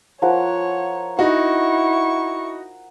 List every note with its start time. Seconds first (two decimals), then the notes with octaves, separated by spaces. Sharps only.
0.22 F3 A#4 C#5 F#5
1.19 D#4 E4 F#4 F#5 C#6